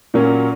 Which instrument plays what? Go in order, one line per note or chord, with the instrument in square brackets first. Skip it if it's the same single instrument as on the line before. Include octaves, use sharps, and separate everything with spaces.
[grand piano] A#2 F#3 A#3 C#4